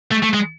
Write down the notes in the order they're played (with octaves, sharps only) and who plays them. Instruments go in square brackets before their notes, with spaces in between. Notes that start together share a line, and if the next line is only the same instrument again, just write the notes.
[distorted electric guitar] A3
A3
G#3